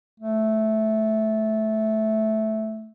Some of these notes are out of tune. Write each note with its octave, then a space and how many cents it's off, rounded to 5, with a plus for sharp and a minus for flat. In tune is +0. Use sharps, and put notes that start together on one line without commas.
A3 -10